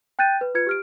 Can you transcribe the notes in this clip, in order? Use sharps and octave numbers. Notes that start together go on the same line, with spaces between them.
G5 F#6 G6 A6 D#7
B4
F4 B4 G#6 C#7
G4 F6 D7